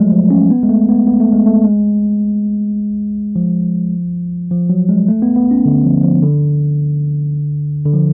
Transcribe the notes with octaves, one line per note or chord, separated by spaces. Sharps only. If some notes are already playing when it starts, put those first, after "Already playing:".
Already playing: F3 F#3 G#3 A3
F3
C#4
B3
G#3
A3
B3
B3
A3
G#3
A3
G#3
F3
F3
F#3
G#3
A3
B3
B3
C#4
D3
F3
F3
D3
D3
F3